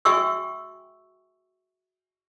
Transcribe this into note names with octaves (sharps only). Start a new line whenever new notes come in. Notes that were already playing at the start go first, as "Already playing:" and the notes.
F#4 E5 G5 G#5 C#6 E6